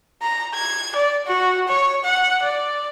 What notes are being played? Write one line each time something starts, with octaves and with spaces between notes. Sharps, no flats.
A#5
G#6
D5
F#4
C#5
F#5
D5